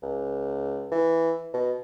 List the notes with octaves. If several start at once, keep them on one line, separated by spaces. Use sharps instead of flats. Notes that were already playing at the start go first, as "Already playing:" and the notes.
C#2
E3
B2